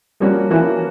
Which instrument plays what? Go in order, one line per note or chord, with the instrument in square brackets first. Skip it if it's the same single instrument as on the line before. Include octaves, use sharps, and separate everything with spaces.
[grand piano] F3 A#3 C#4 F#4 [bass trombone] G3
[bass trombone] E3 [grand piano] F3 A#3 C#4 F#4